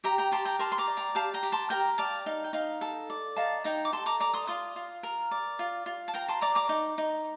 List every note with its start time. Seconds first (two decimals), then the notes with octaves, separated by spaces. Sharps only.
0.04 G4 G5 A#5
0.18 G5 A#5
0.32 G4 A5 C6
0.45 G5 A#5
0.59 A#4 A5 C6
0.72 C6
0.78 A#5 D6
0.88 D5
0.97 G5 A#5
1.15 G4 F5 A5
1.34 G5 A#5
1.43 G4
1.52 A5 C6
1.70 A#4 G5 A#5
1.98 D5 F5 A5
2.26 D#4 F5
2.44 G5
2.53 D#4 F5
2.81 A4
3.10 D5
3.36 D#4 F5 A5
3.64 D#4 G5 A#5
3.85 D6
3.93 A4 A5 C6
4.06 A#5 D6
4.20 D5 A#5 D6
4.34 C6 D#6
4.47 F4 C6 D#6
4.76 F4
5.03 A#4
5.31 D5
5.59 F4
5.86 F4
6.08 A5
6.14 A#4 G5 A#5
6.28 A5 C6
6.41 D5 A#5 D6
6.55 A#5 D6
6.69 D#4
6.98 D#4